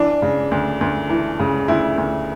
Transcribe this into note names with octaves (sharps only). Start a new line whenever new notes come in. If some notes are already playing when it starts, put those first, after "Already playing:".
Already playing: E3 D4
C#3
D2
D2
E3
C#3
D2 E4
D2